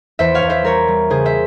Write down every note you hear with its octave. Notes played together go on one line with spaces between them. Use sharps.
E2 C5 E5
C#5 F5
E2
C5 E5
G3 A#4 C#5
G3
C#3 G#4 C5
C5 E5